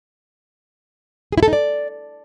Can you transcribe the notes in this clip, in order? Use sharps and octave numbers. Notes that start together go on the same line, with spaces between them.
G#4
E4
A4
D#4
D5